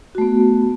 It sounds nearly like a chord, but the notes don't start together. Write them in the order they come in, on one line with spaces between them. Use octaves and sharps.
F#4 A3 B3